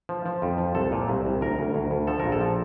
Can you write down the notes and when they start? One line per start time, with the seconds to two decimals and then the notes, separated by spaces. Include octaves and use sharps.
0.09 F3
0.26 F3
0.42 F2
0.58 F3
0.75 C2 A4
0.92 A#2
1.08 C2
1.25 C2
1.41 D2 A#4
1.59 D2
1.75 D2
1.91 D2
2.07 F3 A4
2.19 A#1 A#4
2.32 A4
2.41 F3